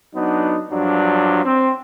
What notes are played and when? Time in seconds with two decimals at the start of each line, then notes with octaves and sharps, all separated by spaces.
0.15 F#3 B3 D4 D#4
0.71 G2 F3 F#3 D4
1.45 C4